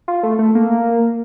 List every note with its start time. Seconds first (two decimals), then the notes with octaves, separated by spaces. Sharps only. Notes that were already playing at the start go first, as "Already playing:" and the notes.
0.08 F4
0.23 A3
0.39 A3
0.55 A#3